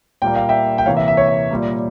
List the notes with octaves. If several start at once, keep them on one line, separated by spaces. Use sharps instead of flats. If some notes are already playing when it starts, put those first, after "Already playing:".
A#2 G3 A#3 G5
F5
E5 G5
G5
C3 E3 A#3 C#5 F5
E5
E5
C#5
E5
A#2 G3 A#3